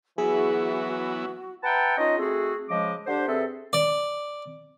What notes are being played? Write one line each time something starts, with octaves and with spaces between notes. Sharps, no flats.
E3 F#3 B3 E4 F#4 G#4
B4 E5 F#5 G5 A5 A#5
C#4 D#4 F4 D#5
A3 C4 F#4 G#4
C#3 F3 G#3 D#5 D6
D3 D4 G4 C5
C3 C4 G#4 A4 B4 E5
D5